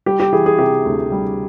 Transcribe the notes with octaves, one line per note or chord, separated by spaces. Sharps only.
G3 G4
G4
E3 G#4
G#4
C3 G4
D2
G3